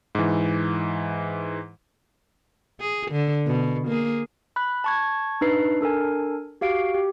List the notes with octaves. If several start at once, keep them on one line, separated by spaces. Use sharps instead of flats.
G#2 E3
G#4
D3
B2
A#3 G#4
B5 F#6
A5 C#6 G#6
D4 D#4 B4 C7
D4 A4 A#4 G#5
F#4 G4 F5 C7 D7
G4